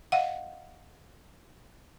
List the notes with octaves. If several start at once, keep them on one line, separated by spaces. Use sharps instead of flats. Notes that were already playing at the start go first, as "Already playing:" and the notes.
D#5 F5 F#5